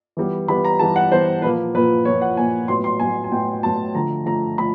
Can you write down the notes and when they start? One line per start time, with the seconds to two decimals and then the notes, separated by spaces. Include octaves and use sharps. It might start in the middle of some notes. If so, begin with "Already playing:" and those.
0.17 E3 G3 B3
0.48 E3 G3 B3 B5
0.65 A#5
0.79 E3 G3 B3 A5
0.96 F#5
1.11 E3 G3 B3 C5
1.42 A#2 F3 A#3 B4
1.75 A#2 F3 A#3 B4
2.05 A#2 F3 A#3 C#5
2.22 F#5
2.37 A#2 F3 A#3 G#5
2.68 A2 F#3 B3 C6
2.84 C6
3.00 A2 F#3 B3 G#5
3.24 G#5
3.32 A2 F#3 B3 G5
3.63 A2 F#3 B3 A5
3.95 D3 F3 A3 A#5
4.26 D3 F3 A3 A#5
4.58 F3 A3 B5